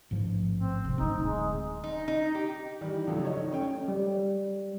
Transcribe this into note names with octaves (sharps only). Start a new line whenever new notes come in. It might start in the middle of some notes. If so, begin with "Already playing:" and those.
A1 G#2 F3
C4
C3 D#3
D1 D3 C4 D#4
G#3
D#4
D#4
G4
D#3 E3 G3
C#2 G2 F3 F#3 A3
D#4 C#5
A3 C#4 C#5 G5
G3